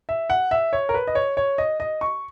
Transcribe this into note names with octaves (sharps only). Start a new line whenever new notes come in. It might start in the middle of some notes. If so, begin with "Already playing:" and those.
E5
F#5
E5
C#5
A#4
B4
D#5
C#5
C#5
D#5
D#5
C#6